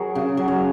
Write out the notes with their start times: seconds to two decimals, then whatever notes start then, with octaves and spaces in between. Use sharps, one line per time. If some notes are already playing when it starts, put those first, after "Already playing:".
Already playing: F#3 F#4 G#4 A#4 C#5
0.15 C#3
0.37 F#3
0.48 C#5